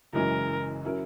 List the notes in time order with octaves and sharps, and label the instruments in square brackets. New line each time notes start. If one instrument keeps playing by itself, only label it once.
[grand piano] F#1 F#2 E3 G#3 C#4 [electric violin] A#4
[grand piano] F#3 C#4 E4 A#4